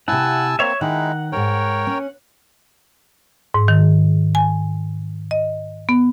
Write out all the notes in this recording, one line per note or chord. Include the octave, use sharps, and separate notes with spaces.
C3 E4 F#5 G#5 A5 E6
A#3 C4 C#5 E5
D#3 G#3 D#4 E4 F#5
D#2 G#2 A#4 C#5 G5
C#4
G#2
D#3
G#5
D#5
B3